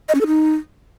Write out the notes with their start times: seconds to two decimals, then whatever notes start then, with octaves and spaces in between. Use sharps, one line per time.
0.09 D#5
0.15 C#4
0.21 A4
0.27 D#4